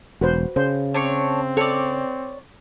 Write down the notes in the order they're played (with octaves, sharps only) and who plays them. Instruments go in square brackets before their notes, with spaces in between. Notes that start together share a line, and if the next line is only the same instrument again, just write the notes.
[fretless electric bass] E1 [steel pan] F#4 B4 C5
[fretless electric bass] C#3 [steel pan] C5
[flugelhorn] C4 [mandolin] D4 C#5 C#6
[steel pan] A4 [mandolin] C#5 D5